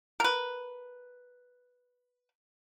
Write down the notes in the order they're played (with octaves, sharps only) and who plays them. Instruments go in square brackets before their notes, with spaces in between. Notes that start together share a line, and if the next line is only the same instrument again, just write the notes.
[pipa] A#4 B4